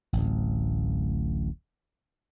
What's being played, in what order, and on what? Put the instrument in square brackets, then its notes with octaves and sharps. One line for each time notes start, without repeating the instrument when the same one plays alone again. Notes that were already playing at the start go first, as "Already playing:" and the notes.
[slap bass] D1 A1